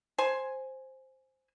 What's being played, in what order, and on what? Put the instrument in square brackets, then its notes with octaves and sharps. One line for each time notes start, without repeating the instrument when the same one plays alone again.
[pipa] C5 G#5